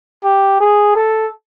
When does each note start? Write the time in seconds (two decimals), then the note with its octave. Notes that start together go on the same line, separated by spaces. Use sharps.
0.24 G4
0.61 G#4
0.96 A4